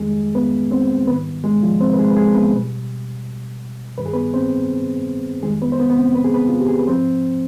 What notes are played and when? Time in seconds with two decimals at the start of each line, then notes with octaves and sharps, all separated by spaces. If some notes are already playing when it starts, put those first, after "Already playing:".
Already playing: F2 D#3 G3 G#3 G#4
0.35 B3 B4
0.71 C4 C5
1.07 G#2 D#3 G3 B3 B4
1.44 G#3 G#4
1.63 F3 F4
1.80 C4 C5
1.93 B4
1.99 G#3 G#4
2.11 B4
2.16 G#3 G#4
2.35 B3 B4
2.54 B2 G3
3.98 G2 D#3 G3 B4
4.06 G#4
4.13 B3 B4
4.34 C4 C5
5.43 F2 D#3 G3 G#3 G#4
5.61 B3 B4
5.72 C5
5.79 B3 B4
5.90 B3
5.97 C4
6.15 B4
6.25 G#4
6.34 B3 B4
6.49 F4
6.59 G4
6.68 G#4
6.79 B4
6.88 G#2 F3 C4 C5